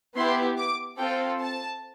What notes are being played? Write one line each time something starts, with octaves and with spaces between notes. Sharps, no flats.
B3 E4 G4 C6
D6
C4 F4 A4 G5
A5